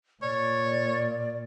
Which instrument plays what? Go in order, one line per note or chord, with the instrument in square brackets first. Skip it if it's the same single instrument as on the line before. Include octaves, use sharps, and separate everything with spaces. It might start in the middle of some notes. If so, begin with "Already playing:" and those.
[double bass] A#2 [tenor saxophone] C#5 [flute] D5